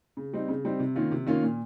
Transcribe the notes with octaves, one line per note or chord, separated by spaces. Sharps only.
C#3
G3 C4 D#4
C#3
G3 C4 D#4
C3
D#3 A#3 C#4 F4
C3
D#3 A#3 C#4 F4
A#2